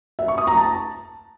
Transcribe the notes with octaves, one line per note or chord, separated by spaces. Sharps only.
E5
C#6
D#6
A#5
A5